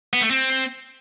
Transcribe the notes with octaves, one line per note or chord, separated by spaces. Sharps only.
B3
A3
C4